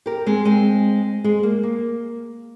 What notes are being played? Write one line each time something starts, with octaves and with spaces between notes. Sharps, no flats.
G4 A#4
G#3 C4
G#3 C4
G#3
A#3
A#3